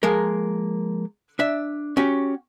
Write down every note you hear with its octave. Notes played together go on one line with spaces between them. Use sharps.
F3 G#3 A#3 A#4
D4 E5
C#4 F#4 G4